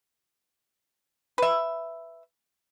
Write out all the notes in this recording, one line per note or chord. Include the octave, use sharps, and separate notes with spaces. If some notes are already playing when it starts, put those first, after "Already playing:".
B4 E5